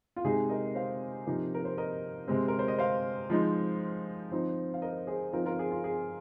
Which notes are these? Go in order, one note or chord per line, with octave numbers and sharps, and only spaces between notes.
F4
C3 G#3 D#4 G#4
A#4 D#5
C5 F5
C3 F3 A#3 D#4
A#4
C5
A#4 D#5
C3 G#3 C4
A#4
C5
D#5
C5 F5
F3 G#3 D#4
F3 C4 D#4
F5
A#4 D#5
G#4 C5
F3 C4 D#4 F4 A#4
F4 A#4
G#4
F4
G#4